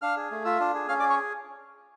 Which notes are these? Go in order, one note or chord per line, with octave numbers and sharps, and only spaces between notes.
D4 F5 F6
G#4
A3
F4 E5 E6
D4
G#4
C#4 F5 F6
G#4 D5 D6
C#5 C#6